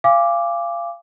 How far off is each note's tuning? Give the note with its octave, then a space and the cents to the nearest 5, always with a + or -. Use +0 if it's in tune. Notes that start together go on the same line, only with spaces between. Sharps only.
F5 -25 G#5 -30 D6 +0